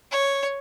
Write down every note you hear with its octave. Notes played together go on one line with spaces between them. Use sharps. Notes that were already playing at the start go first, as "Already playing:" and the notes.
C#5